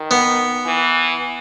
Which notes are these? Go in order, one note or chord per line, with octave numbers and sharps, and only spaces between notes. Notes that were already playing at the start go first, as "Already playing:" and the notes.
Already playing: D#3
B3
E3